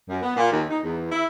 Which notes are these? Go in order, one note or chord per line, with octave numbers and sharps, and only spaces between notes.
F#2
B3
A#2
D#2
D#4
E2
E4